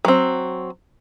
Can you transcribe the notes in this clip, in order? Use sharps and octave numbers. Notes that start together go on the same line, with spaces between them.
F#3 C4